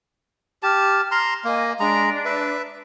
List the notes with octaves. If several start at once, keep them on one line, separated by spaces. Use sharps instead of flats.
G4 A5 F6
A#5 C6
A#3 D#5 G#5
G#3 D4 D5 A#5
B4 E5